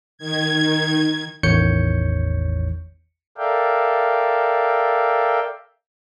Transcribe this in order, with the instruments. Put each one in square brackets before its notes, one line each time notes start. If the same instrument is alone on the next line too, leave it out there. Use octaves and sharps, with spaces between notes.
[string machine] D#3 G#6
[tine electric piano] A1 E2 D#3 C#5 G6 C#7
[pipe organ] A4 A#4 D5 E5 F5 G5